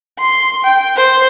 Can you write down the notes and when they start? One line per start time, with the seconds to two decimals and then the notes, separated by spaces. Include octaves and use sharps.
0.19 C6
0.65 G5
0.96 C5